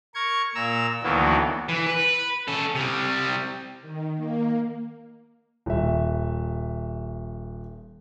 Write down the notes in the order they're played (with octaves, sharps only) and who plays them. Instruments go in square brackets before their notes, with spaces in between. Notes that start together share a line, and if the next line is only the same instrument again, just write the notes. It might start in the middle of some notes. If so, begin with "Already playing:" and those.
[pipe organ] A#4 C#6 G#6
A#2 A#5 E6
D2 D#3 E3 F#3 A#3 B3
[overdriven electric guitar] E3
B4
C#4 A4
C3 G3
[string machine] D#3
A#3
[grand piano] D#1 E5